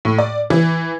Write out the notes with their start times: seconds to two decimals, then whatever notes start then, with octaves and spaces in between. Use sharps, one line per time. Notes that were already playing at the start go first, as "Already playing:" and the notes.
0.05 A2
0.18 D5
0.50 E3